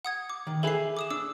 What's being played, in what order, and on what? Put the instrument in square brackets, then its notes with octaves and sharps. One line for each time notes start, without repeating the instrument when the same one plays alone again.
[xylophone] F#5 D#6 G#6
D6
[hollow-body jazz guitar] D#3
[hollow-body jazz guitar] G#4 B4 E5 [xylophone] A4 C7
[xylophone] D6 D#6 E7
[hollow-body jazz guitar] D4 [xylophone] D6 E6